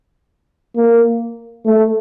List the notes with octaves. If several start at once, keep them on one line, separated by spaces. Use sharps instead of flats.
A#3
A3